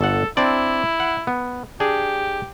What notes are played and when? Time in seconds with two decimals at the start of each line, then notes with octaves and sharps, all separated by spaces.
0.01 G1 A4 F#5
0.37 C4 D4 E4 D5
1.00 F#5
1.27 B3
1.80 D4 G4 G#4